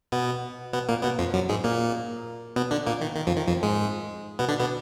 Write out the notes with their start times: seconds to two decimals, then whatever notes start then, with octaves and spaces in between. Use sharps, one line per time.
0.12 B2 B3
0.73 B2 B3
0.88 A#2 A#3
1.03 B2 B3
1.19 F2 F3
1.34 F#2 F#3
1.49 G#2 G#3
1.64 A#2 A#3
2.56 B2 B3
2.71 D3 D4
2.86 A#2 A#3
3.01 D#3
3.16 D#3
3.27 F2 F3
3.37 D#3
3.47 F2 F3
3.63 G#2 G#3
4.39 B2 B3
4.49 D3 D4
4.60 B2 B3